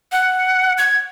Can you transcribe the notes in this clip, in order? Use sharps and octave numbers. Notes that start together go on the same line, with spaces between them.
F#5
G#6